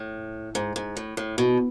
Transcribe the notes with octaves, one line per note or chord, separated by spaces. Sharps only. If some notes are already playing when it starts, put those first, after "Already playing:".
Already playing: A2
G#2
G#2
A2
A2
B2